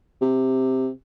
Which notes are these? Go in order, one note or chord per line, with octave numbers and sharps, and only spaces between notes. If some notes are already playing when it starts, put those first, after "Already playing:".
C3